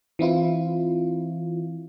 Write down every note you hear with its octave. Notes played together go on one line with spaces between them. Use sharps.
E3 C4 E4 F4